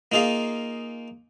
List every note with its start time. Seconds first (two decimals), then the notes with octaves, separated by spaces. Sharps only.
0.12 A#3 D#4 F4 G#4 F5